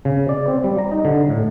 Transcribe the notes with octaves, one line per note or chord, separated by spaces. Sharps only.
C#3
D5
C4
G3
A#5
D#4
D3
A2